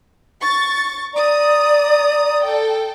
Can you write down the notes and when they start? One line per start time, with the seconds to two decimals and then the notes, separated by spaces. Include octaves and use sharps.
0.40 C#6 A6
1.14 D5 A#5 D#6
2.44 A4 G5